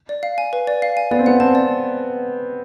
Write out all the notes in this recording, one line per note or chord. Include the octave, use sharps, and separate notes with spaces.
D5
F5
G#5
B4
D5
F5
G#5
B3 D5
C4
B3 F#5
C4 A5
D5